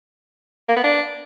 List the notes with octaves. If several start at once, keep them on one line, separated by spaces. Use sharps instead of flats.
A#3
B3
D4